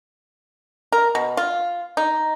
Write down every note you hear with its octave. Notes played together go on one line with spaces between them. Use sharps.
A#4
B2
F4
D#4